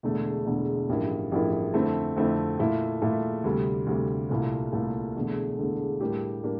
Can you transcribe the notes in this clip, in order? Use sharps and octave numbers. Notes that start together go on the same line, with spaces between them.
E1 E2 D3 A3
E1 E2 D3 A3
A1 G2 F3 A#3 E4
A1 G2 F3 A#3 E4
F2 D3 A3 C4 E4
F2 D3 A3 C4 E4
A#2 A3 E4
A#2 A3 E4
D2 C3 G3
D2 C3 G3
C2 A#2 A3 E4
C2 A#2 A3 E4
E1 E2 D3 A3
E1 E2 D3 A3
A2 G3 A#3 D4 G4
A2 G3 A#3 D4